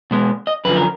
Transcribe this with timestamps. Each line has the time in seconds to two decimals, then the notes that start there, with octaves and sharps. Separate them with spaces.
0.11 B2 G#3 B3
0.47 D#5
0.65 F#2 D3 F3 B4
0.76 A#4